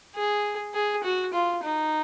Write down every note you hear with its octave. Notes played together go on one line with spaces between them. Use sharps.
G#4
G#4
F#4
F4
D#4